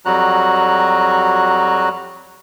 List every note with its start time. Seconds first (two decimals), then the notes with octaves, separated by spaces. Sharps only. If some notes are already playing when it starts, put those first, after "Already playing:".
0.05 F2 F#3 G3 F#4 A#5 F#6